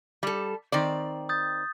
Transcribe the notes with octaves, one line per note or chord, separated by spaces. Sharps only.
G3 A4
D#3 C4 D5
D#6 G6 A6